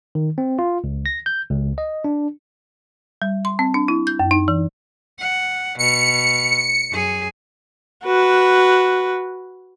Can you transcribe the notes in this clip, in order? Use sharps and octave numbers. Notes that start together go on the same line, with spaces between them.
D#3
C4
F4
C#2
A#6
G6
C#2
D#5
D4
G3
C6
C4
D4
E4
G6
F#2
D#4
E3
F#5
B2 C#7
F#2 G#4
F#4 B4